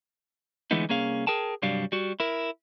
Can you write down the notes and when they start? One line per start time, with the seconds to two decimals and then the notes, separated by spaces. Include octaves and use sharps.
0.71 D3 E3 G#3 A3 B3 D#4
0.89 C2 A#3 C#4 G#4 F5
1.27 G#4 A#4 G5 A5
1.62 C2 G2 F#3 G3 D4 F5
1.92 G3 F#4
2.20 E4 A#4